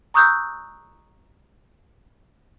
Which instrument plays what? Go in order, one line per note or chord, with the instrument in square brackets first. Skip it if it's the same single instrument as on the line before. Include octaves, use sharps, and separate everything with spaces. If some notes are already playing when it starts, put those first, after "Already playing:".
[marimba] A#5 C#6 D#6 E6 F#6 G6